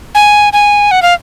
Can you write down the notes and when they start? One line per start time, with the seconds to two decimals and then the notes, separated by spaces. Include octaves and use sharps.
0.15 G#5
0.53 G#5
0.91 F#5
1.02 F5